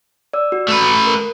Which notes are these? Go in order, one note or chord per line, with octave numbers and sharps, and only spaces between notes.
D5 E6
F#4
A3 B4
A#4